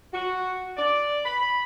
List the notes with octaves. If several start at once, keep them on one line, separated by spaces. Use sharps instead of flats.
F#4
D5
B5